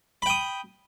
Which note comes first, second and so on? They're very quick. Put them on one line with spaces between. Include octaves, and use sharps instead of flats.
B5 G5 D#6